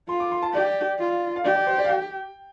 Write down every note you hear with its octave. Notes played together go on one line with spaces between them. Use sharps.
F4 C6
D6
C6
A5
G4 D5
F4
F5
G4 D5
D5
C5
D5
F5
G5